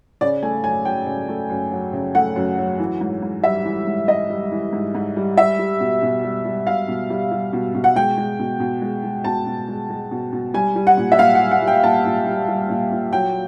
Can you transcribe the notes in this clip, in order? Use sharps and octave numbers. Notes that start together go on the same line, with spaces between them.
C#3 D5
A3 G#5
F#2 G#5
F#3 G5
C#3
A3
F#2
F#3
C#3
A3 F#5
F#2
F#3
E3
G#2
G#2
G3 E5
E3
G#2
G#2 D#5
G3
E3
G#2
G#2
G3
G3 E5
G3
B2
B2
G3
G3
B2 F5
B2
G3
G3
B2
B2
F#5
G#3 G5
G#3
B2
B2
G#3
G#3
B2 A5
B2
G#3
G#3
B2
B2
G3 G#5
G3
F#5
A#2
E5
A#2 F5
F#5
G3
F#5
G3
G5
A#2 A5
A#2
G3
G3
A#2
A#2
F#3 G5